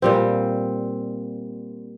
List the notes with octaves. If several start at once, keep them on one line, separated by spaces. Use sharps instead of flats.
A#2 G3 C4